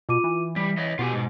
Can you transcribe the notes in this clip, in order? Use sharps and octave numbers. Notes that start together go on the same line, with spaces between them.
B2 F4 D6 D#7
E3
G3 B6
C#5 D#5
B2 F4 G4 G#5
G#2